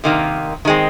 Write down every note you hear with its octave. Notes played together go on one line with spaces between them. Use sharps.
C3 D#3 A#3
D#3 G#3 C4